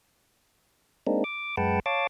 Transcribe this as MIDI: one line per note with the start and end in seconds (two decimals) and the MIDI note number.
1.07 1.24 56
1.07 1.24 58
1.07 1.24 60
1.07 1.24 62
1.07 1.24 63
1.24 1.56 86
1.57 1.80 42
1.57 1.80 56
1.57 1.80 71
1.57 1.80 78
1.57 1.80 79
1.57 1.80 81
1.86 2.07 73
1.86 2.07 77
1.86 2.07 81
1.86 2.07 86